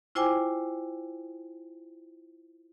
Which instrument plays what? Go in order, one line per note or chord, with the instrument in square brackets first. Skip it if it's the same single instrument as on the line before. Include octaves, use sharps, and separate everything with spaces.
[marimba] E4 F4 C5 G5 G#5 D6